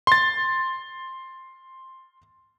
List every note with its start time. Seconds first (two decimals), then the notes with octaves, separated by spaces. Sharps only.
0.07 C6 A6